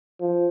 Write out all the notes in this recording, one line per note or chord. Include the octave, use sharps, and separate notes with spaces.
F3